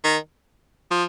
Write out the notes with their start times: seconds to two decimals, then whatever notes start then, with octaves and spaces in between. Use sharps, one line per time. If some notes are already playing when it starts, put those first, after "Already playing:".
0.04 D#3
0.91 F3